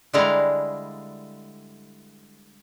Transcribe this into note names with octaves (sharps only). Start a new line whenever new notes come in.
D3 G3 G#3 E4 F5 A#5